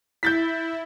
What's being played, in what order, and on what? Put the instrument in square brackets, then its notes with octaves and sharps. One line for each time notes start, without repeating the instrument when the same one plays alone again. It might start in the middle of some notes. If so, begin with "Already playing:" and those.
[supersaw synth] E4 [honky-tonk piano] G6 A6 B6